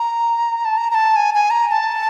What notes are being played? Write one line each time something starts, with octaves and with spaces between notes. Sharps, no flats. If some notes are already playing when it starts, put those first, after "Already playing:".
Already playing: A#5
A5
A#5
A#5
A5
G#5
G#5
A#5
A#5
A5